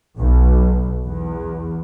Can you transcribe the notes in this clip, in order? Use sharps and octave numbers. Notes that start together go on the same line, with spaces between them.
B1
E2